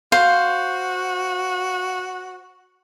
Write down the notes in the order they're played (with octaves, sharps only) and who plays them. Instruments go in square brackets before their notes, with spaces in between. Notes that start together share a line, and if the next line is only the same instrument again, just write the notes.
[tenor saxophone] F#4 [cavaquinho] C5 [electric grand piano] F5